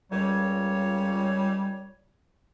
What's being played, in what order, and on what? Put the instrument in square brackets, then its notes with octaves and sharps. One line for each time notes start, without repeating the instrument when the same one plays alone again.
[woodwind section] C#2 A#2 C#5 [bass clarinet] G3